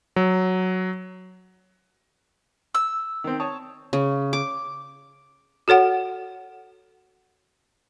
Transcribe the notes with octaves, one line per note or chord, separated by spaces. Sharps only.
F#3
E6
D#3 C4
C#5 A5 D#6
C#3
D6
F#4 A4 C#5 F#5